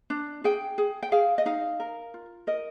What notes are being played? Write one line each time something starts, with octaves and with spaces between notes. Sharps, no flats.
D4
G#4 G5
G#4
G5
G#4 F5
D#5
D#4 F5
A#4
F4
A#4 D#5